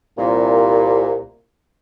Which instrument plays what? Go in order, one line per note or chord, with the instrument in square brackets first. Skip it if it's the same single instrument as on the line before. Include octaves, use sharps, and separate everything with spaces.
[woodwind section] C2 A#2